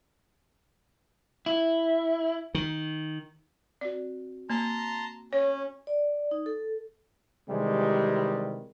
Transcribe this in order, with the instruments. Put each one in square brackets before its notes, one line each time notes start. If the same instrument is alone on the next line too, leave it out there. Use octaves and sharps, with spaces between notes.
[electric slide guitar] E4
[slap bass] D#3
[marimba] C4 F#4 [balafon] D5
[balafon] A#3 [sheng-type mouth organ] A5 A#5 C6
[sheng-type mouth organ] C#4 [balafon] C#5
[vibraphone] D5
D#4
A4
[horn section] C3 D#3 E3 G3 G#3